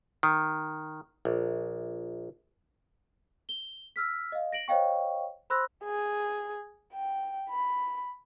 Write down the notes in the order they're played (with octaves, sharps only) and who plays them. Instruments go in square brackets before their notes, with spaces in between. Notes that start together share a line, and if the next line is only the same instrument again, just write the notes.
[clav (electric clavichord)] D#3
A#1
[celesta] G7
E6 F6 B6
D#5 F5
A#6 D7 F#7
C5 C#5 D#5 F5 G5 C#6
C5 B5 C6 E6 F#6 A#6
[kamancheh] G#4
G5
B5